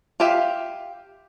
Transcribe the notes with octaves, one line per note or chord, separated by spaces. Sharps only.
F4 G4 E5 F5